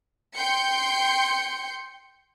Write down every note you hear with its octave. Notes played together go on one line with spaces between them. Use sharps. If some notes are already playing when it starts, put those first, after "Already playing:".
G5 C6 G6 C#7